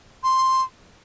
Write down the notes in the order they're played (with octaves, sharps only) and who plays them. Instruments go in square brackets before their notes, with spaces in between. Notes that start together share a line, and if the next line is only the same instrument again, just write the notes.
[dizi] C6